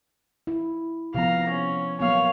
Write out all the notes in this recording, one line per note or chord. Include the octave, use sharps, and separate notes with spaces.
E4
C3 F3 B3 F5 A#5
C#4
F#3 A#3 B3 C#5 F5